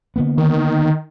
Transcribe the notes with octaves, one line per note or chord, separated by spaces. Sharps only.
D3 A#3 B3
D#3